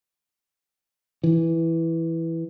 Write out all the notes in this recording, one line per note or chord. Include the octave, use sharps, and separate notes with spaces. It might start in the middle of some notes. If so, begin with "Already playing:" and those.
E3